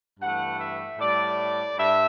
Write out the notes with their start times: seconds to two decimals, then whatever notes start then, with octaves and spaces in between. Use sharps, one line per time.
0.19 G2 E3 A3 F#5
0.59 E5
0.99 A2 G3 D5
1.77 G2 E5